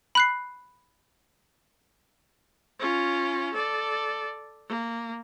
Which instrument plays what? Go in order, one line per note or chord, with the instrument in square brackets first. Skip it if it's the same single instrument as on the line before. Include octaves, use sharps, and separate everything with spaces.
[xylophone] B5 F#6 C7
[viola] C#4 F4
A4 D5
A#3